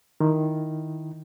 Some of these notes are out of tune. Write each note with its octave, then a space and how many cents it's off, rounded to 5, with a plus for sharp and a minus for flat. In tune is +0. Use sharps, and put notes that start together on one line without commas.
D#3 +0 E4 +0